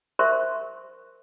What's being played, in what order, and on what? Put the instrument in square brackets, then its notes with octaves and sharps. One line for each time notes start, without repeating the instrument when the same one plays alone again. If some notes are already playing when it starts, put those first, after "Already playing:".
[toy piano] A#4 C5 E5 C6 C#6